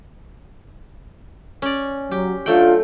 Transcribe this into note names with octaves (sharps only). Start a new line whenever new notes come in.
C#4 D5
F#3 G4
F#3 A3 D4 F4 G5